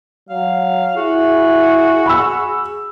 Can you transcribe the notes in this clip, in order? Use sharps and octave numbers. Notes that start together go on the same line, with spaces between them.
F#3 F5
E4 F#4 G#4
B5 E6